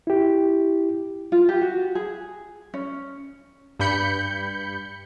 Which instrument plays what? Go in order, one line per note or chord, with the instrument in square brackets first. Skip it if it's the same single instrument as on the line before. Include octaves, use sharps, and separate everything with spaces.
[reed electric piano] E4 G4
[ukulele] F4
G4
F#4
G#4
C#4
[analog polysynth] G2 G3 B5 G6 C#7